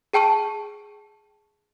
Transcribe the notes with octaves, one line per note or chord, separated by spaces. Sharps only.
G#4 G5 A5 C#6 D#7